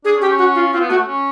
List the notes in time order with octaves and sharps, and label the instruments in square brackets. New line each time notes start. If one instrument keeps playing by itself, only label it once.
[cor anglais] D4 [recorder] G#4
[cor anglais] C#4
[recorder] G4
[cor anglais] C#4
[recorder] F#4
F4
[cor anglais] C4 [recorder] F4
[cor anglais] B3
[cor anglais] A3 [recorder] F#4
[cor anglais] C#4